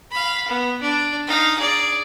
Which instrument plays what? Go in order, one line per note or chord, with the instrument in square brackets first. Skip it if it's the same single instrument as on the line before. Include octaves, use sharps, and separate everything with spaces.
[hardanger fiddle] F5 B5
B3
D4
D#4 F5
G#4 D5